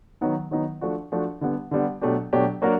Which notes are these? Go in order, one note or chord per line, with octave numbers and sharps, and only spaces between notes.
D#3 F#3 B3 D#4
D#3 F#3 B3 D#4
F3 A3 D4 F#4
F3 A3 D4 F#4
D3 G3 B3
D3 G3 B3
B2 F#3 A3 D4 G4
B2 F#3 A3 D4 G4
F#3 A#3 D4 F#4 A#4